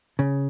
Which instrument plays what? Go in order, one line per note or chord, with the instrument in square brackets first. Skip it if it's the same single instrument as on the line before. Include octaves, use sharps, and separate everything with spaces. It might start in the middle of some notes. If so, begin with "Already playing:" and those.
[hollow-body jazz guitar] C#3